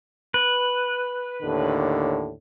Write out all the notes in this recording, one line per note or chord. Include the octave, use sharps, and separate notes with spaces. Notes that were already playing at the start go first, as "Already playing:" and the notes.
B4
D#2 A2 D3